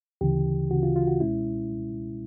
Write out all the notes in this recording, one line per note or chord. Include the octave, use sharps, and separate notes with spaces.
D2 C#3 E3 G4
D2 C#3 E3 F#4
F4
F4
F#4
C#2 B2 G#3 C#4 E4